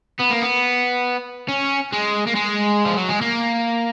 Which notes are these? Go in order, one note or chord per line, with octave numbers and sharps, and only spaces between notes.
B3
A#3
B3
C#4
G#3
A#3
G#3
F3
F#3
G#3
A#3